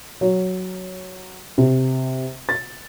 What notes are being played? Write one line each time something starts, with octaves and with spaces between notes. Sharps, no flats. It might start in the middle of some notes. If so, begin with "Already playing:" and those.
F#3
C3
A6